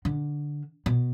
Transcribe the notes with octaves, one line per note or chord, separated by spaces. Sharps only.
D3
B2